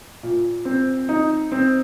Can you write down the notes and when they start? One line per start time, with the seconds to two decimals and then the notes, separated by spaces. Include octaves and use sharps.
0.23 A#2
0.65 C4
1.09 D#4
1.52 C4